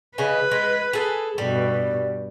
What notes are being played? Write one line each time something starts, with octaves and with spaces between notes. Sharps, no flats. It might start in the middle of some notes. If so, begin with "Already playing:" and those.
C#3 B4 D#5 G#5
G#3
G#4 A4
G2 B2 G3